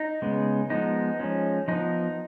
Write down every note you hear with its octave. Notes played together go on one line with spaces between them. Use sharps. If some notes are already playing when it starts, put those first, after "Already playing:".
Already playing: D#4
C#3 G#3 B3
F3 G#3 B3 D#4
F3 G#3 C#4
F3 B3 D#4